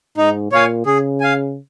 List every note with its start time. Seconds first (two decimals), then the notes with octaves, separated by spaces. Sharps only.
0.17 G#2 D#4
0.52 A#2 C#5 F5 G#5
0.86 C#3 G#4
1.20 F5 G#5